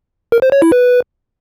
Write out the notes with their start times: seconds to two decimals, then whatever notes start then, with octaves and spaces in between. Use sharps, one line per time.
0.32 A#4
0.42 C5
0.52 C#5
0.62 E4
0.72 B4